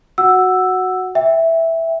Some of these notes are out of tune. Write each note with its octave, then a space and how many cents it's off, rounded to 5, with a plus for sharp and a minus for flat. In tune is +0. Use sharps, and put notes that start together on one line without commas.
F#4 -5 F#5 +0 E6 +0
E5 -5 G5 +10